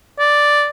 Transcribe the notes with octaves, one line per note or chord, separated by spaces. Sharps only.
D5